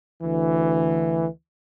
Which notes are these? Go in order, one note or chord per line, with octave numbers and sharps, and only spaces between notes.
D2 E3